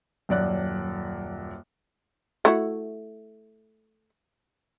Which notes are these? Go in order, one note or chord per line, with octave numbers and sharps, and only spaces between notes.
D#1 F#2 D5 F#6
A3 E4 F#4